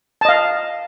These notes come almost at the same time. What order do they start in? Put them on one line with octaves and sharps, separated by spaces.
A5 D#5 F5